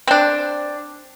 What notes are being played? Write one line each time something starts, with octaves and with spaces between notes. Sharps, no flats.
C4 D4